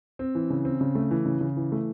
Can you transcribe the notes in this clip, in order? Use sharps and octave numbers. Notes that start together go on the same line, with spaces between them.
C4
E3
C#3
C4
C#3
A3
E3
C#3
C#3
E3
A3